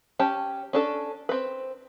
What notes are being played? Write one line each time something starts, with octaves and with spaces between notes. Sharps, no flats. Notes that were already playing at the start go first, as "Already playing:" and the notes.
C#4 G4 G5 A5
C#4 D4 A4
C4 B4